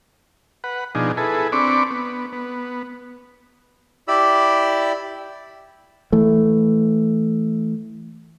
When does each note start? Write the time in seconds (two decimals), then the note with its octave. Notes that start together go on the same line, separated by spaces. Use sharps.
0.64 B4 F#5
0.95 B2 F3 D4 D#4 G#4
1.17 E4 G#4 A4 B4
1.52 C4 D4 B5 C#6 D6
1.91 B3
2.33 B3
4.08 E4 G4 D5 B5 E6
6.13 E3 A3